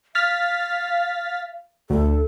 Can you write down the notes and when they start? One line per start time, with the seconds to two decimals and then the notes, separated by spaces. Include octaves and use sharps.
0.15 F5 F6 A6 B6
1.90 D2 A4